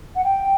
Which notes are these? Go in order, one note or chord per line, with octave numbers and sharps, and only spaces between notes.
F#5
G5